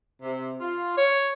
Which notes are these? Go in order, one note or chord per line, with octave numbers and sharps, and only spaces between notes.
C3
F4
C#5